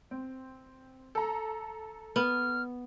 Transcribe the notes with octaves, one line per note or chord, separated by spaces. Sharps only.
C4
A4 A#5
B3 F6